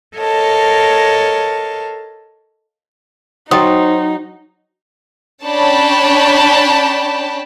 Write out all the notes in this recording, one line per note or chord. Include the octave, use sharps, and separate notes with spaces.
A4 A#4 C#5 D#5 F5 A5
F#3 D#4 F#4 C5 G5 D#6
C#4 D4 C#5 G5 A5 B5